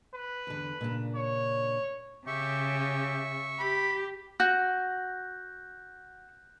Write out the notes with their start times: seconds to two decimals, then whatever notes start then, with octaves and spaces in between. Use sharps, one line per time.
0.14 B4
0.47 E2 D3
0.81 A#2 C#3 D4
1.15 C#5
2.27 C#3 G4 E5 C#6
3.59 G4 B5
4.40 F#4 F#6 G6 A#6